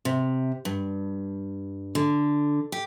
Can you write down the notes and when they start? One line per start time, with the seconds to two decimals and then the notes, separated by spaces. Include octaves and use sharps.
0.05 C3
0.65 G2
1.95 D3
2.72 G4